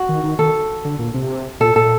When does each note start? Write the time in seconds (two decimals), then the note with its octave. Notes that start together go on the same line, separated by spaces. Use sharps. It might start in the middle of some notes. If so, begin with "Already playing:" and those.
Already playing: F#4
0.09 D#3
0.24 D#3
0.39 D#3 A4
0.85 D3
0.99 A#2
1.14 C3
1.60 A#2 A4
1.76 A#2 A4